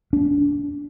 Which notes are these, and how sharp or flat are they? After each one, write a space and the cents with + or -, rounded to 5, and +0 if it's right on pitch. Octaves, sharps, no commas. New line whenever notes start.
D4 -30